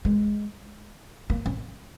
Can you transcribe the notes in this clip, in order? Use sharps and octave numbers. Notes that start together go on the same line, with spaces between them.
G#3
A#3
C#4